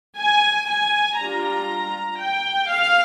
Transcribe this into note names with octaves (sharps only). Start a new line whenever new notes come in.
G#5
G#5
G3 D4 F4 A#5
G5
F5